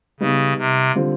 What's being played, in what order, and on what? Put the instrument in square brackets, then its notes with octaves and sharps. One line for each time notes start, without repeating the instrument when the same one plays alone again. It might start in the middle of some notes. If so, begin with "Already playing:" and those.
[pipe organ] C#3 [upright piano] G3 B3 D#4
[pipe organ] C3
[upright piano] D3 G3 C4 F4